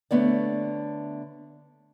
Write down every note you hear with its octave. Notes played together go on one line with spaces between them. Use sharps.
D3 A3 B3 C#5 D5